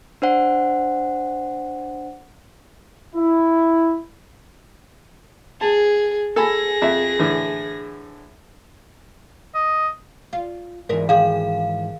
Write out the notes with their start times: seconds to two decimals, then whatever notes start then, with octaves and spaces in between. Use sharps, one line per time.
0.22 D4 C5 F#5
3.15 E4
5.61 G#4 A5
6.36 G#4 A4 G#5 B5 A#6
6.82 F2 E5
7.19 A2 D3 E3
9.55 D#5
10.33 F4
10.89 G#2 E3 A#4 D#5 E5
11.09 D#3 G#4 F5